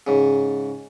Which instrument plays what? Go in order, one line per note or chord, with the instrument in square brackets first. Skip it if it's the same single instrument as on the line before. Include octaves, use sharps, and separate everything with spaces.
[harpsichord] G#2 C#3